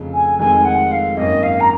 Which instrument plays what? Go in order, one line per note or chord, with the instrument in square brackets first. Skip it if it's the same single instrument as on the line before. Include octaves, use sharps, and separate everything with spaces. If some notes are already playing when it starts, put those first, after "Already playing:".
Already playing: [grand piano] F1 F2 C#3
[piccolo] G#5
[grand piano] F1 F2 D#3 G#3 C4 [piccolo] G#5
[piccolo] F#5
F5
[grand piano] G#1 F#2 D#3 A#3 C#4 [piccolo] D#5
[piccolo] F5
A#5